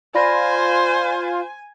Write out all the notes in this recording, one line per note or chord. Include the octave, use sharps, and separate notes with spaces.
F4 C5 D5 G#5 B5 A#6